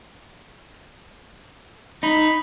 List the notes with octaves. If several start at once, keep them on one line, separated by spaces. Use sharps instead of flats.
D#4 B5